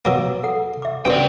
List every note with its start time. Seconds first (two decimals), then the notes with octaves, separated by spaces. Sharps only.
0.05 B2 F#3 A#3 D6 E6
0.43 A4 F#5
0.82 E5 D6
1.05 C#3 B3 D4 F#4 A#4 C5 D5 G5